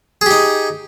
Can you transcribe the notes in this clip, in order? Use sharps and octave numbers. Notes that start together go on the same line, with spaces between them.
D#4 G4 G#4